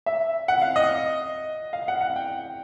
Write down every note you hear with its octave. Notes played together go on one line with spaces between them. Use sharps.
E5
F#5
F5
D#5
F5
F#5
F#5
G5